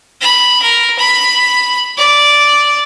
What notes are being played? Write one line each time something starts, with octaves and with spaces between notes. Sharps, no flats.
B5
A#4
B5
D5